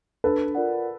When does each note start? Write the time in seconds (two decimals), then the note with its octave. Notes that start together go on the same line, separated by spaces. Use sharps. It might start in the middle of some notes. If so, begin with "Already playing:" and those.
0.24 D4 A4 B4
0.55 F4 A#4 D5 F#5